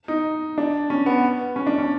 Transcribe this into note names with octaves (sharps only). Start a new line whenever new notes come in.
D#4
D4
C#4
B3
C#4
D4
C#4